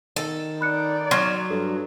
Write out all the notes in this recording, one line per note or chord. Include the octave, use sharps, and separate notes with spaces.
D#3 A4
D#4 D5 B5 F#6 C#7
F#3 C6 C#6 F6
G2 A4